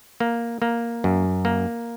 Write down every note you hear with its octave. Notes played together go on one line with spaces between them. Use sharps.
A#3
A#3
F#2
A#3